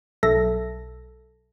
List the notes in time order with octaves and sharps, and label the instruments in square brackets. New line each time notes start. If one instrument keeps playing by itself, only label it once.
[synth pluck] B1 A4 E5 A#6